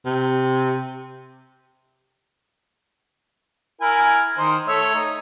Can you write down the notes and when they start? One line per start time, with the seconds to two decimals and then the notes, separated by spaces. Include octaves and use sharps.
0.06 C3
3.81 E4 A#4 G#5
4.38 D#3 D#4 C5
4.68 A3 C#5 E5
4.95 D#4